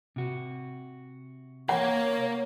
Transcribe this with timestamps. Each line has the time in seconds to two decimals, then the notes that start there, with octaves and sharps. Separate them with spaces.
0.16 C3 F#4
1.69 A#3 A#4 C#5 F#5